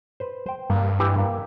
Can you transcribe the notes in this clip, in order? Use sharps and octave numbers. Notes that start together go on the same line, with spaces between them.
B4 C5
C5 G5
G2 A#3
E3 G4 E5
A#3